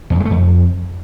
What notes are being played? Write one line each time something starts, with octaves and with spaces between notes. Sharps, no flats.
E2
F#2
G#3
A3
F2